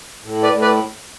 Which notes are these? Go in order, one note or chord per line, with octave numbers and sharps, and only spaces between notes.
A2
B4 D5
A2
B4 D5